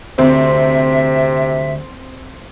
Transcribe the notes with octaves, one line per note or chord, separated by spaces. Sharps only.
D2 C3 C4 E5